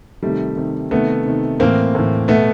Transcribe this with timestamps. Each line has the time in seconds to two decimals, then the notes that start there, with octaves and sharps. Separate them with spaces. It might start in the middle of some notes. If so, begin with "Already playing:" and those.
0.23 C3 D#3 G3 A3
0.57 C3 D#3
0.91 C3 D#3 A3 B3
1.26 C3 D#3
1.60 A2 E3 A#3 C4
1.95 A2 E3
2.28 B2 A3 B3